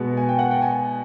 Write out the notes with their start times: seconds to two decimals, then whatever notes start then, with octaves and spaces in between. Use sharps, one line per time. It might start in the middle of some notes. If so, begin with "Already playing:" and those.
Already playing: B2 G#3 B3
0.17 G#5
0.29 G5
0.39 F#5
0.51 G5
0.62 G#5